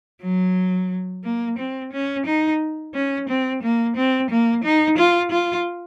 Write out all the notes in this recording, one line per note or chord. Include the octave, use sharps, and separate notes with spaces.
F#3
A#3
C4
C#4
D#4
C#4
C4
A#3
C4
A#3
D#4
F4
F4